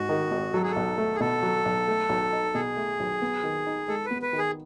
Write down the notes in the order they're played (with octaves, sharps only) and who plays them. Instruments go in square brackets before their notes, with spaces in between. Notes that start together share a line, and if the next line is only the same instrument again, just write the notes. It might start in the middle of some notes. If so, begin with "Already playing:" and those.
Already playing: [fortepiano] G#1 G#2 [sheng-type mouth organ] F#4
[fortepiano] D#3
G#1
[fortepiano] F#3 [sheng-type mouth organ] A4
[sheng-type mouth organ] G#4
A4
[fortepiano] B1
A3
[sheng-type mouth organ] G#4
[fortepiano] B2 [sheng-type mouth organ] A4
[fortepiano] F#3
B1
A3
B1
D#4
[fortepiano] B2 [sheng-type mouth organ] G#4
[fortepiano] A3
B1
B3
D#3
D#4
[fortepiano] G#3 [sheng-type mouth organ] A4
[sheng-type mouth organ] B4
[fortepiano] B3
[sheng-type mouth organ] B4
[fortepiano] D#3
[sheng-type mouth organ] G#4